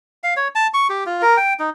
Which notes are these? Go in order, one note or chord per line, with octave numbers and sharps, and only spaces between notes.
F5
C#5
A5
C#6
G4
F4
A#4
G5
D#4